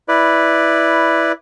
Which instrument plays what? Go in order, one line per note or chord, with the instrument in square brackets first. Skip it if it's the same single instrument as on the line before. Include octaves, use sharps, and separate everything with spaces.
[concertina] E4 B4 D5